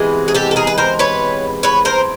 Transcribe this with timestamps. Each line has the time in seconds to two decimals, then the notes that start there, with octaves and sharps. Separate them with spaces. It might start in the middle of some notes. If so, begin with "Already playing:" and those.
Already playing: C3 E3 G#3 B3
0.28 G#4
0.35 G4 A4
0.51 A4
0.56 G#4 A#4
0.67 B4
0.78 A#4 C5
0.99 B4 C#5
1.63 B4 C#5
1.85 A#4 C5